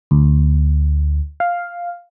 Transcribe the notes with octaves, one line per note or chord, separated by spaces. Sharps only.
D2
F5